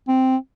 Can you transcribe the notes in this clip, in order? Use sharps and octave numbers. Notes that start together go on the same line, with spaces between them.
C4